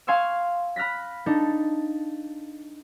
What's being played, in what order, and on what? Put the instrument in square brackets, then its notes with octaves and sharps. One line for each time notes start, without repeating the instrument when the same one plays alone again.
[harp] F5 G#5 C6 C#6 E6
B5 F6 F#6 A#6 B6
D4 D#4 A4